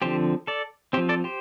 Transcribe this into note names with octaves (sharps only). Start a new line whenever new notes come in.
D3 F3 C4 G4 C5
A4 D5
F3 C4 G4 C5
A4 D5
G4 C5